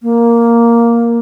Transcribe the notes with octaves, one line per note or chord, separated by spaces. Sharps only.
A#3